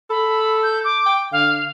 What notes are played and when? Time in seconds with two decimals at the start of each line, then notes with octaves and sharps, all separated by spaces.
0.10 A4 B5
0.63 G6
0.84 D6
1.06 G5
1.32 D3 F5